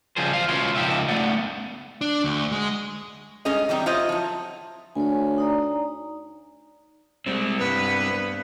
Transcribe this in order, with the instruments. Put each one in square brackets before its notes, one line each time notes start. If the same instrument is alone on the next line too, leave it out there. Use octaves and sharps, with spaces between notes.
[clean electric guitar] C#3 F3 G3 G#4 C5
E2 C5 F5
C#2 B2 E4 F4 C#5 C6
C#2 F3 D#4 G4 E5
A3 B3 D5 F#5
[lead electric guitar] D4
D2
G#3
[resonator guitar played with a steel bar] G2 G#3 C#4 G#4 D#5
E3 G3 C4 D#4
E4 F4 C5 C#5 D#5
F3 F#3
[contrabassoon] D2 [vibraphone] C#5 G#5
[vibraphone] D#4 D5 A#5
[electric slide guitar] G3 C4 [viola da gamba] G#3
[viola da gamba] G2 B3 [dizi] B4